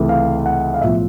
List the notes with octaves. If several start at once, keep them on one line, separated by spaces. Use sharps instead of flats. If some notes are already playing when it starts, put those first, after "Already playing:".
Already playing: C#2 C3 E3 A3
F5
F#5
F5
B1 A2 F3 E5